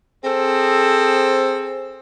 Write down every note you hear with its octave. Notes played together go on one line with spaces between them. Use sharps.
C4 G#4 A4 C5